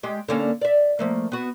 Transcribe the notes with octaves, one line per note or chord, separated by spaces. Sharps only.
G#3 G4
D3 A#3 C#4
D5 E5
F3 A3 A#3
B3 F#4